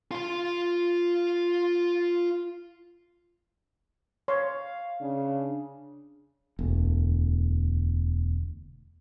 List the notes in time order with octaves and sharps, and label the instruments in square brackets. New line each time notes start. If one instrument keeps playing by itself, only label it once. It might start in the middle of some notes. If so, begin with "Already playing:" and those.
[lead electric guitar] F4 C6
[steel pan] C#5 C6 [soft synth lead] F5
[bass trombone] C#3 [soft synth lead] D4
[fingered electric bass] E1 D2